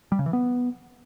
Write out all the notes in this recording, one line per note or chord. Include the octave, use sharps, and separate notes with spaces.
G3
C#3
E3
B3